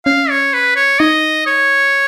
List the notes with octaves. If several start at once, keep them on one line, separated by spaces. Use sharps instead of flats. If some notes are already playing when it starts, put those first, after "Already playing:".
C#4 F5
C#5
B4
C#5
D#4 D#5
C#5